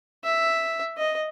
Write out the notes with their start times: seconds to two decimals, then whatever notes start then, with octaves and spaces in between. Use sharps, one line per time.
0.24 E5
0.97 D#5